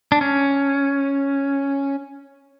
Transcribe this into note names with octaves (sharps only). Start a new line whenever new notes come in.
D4
C#4